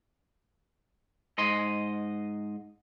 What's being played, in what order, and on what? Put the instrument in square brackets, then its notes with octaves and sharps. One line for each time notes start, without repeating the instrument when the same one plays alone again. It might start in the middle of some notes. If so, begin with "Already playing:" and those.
[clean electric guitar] G#2 D#5 C6